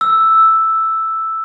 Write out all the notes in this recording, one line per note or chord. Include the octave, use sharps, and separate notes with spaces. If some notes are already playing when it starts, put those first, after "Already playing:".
E6